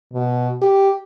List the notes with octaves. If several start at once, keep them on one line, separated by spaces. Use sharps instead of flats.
B2
G4